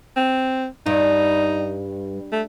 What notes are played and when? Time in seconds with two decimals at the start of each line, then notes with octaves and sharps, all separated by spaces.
0.17 C4
0.86 G2 D#4
2.33 A3